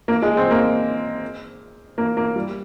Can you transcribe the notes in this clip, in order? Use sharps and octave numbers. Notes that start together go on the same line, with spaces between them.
A#3
G#3
C4
A#3
A#3
A#3
G3